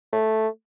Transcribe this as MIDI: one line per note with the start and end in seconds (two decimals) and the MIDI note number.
0.13 0.48 57